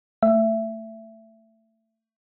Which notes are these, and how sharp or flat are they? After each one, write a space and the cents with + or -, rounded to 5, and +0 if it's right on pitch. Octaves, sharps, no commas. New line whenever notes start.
A3 +20 E5 +15